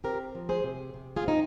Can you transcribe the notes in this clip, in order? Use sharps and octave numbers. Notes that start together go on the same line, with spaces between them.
C4 G4 A#4
F3
G#4 C5
C3
C3
F4 G#4
C4 D#4